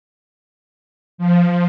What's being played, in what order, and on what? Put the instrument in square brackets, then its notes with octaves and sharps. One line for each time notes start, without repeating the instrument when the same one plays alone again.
[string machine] F3